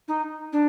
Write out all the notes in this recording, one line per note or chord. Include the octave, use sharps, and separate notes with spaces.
D#4
D4